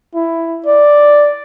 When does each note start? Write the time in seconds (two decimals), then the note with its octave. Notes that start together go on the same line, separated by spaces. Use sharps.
0.15 E4
0.66 D5